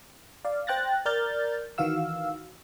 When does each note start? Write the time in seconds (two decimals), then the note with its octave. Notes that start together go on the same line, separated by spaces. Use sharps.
0.45 D5 F5
0.67 C5 G5 F#6 A6 A#6
1.05 A#4 D5 F6 G6 A6
1.78 D#3 E3 F#4 F5 E6